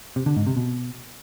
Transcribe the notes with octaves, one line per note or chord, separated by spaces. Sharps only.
C3
D3
G#2
C3
B2